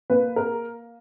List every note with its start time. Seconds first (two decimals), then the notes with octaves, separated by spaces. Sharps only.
0.10 A#3 B4
0.36 A#4